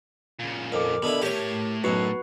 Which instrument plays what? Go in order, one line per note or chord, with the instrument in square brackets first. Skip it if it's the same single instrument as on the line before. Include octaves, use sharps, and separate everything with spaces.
[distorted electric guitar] A#2 C#3
[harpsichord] F2 [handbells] A#4 D6
[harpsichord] B2 D3 E4 [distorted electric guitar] B5
[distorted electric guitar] A2 A3 [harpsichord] G4 C#5
[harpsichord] B1 F#2 [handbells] F#4 B4